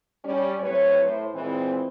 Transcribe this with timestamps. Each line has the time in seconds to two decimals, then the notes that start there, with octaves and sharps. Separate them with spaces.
0.25 G3 C#4
0.60 A2 F#3 C4 B4 C#5
1.03 A2 C5
1.35 A#2 E3 G#3 C4